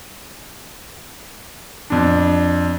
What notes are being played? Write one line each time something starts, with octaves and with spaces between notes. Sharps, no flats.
F2 D4